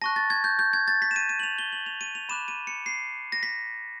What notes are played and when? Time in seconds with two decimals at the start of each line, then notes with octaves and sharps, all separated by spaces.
0.02 A5 C#6 F#6 A#6
0.16 A6
0.30 G#6
0.44 G6
0.59 G6
0.73 G#6
0.88 A6
1.02 B6
1.11 E7
1.16 D#7
1.29 D#7
1.40 F#7
1.43 F7
1.58 G7
1.73 F#7
1.86 F7
2.01 D#7
2.15 F7
2.29 B5 D6 F#6 E7
2.48 D#7
2.67 C#7
2.86 C7
3.32 A#6
3.43 B6